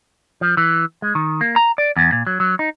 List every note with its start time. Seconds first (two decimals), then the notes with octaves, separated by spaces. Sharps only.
0.41 F3
0.57 E3
1.02 G#3
1.15 D#3
1.41 A#3
1.56 A#5
1.78 D5
1.97 E2
2.12 A#2
2.27 F#3
2.40 F#3
2.59 D#4